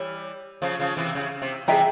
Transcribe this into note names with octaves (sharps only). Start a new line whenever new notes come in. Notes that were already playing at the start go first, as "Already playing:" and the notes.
Already playing: E3 G3 C#5
C#3 F3
C#3 F3
C3 E3
C#3
C3
C3 E3 G#4 E5 G5 A#5